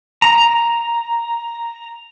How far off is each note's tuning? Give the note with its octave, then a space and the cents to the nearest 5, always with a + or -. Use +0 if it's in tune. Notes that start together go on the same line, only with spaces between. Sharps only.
A#5 +5